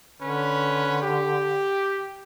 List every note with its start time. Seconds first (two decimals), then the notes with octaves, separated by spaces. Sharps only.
0.20 D3 C#4 B4
1.02 G4